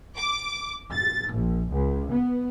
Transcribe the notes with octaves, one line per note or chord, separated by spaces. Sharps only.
D6
A6
A#1
C#2
B3